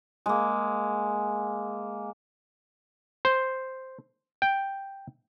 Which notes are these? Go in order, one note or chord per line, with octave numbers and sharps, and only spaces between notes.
G#3 A#3
C5
G5